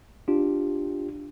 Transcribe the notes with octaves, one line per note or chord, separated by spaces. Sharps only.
D4 F4 G4